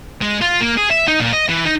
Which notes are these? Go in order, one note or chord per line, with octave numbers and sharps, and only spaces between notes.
G#3
F4
A#3
G#4
E5
D#4
A#2
D#5
E3
D#4